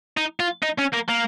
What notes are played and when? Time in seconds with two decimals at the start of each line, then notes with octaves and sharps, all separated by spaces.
0.17 D#4
0.40 F4
0.62 D#4
0.78 C#4
0.93 A#3
1.09 A#3